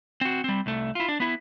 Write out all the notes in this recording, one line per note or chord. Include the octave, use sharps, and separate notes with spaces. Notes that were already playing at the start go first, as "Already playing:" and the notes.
C4 F#4
G3 C4
C2 A3
E4 F4
D4
B3 E4